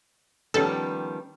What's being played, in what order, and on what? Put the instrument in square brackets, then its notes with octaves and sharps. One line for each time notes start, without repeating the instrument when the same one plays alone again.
[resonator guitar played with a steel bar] D#3 F3 G3 [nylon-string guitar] B3 C#4 G4 [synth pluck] A4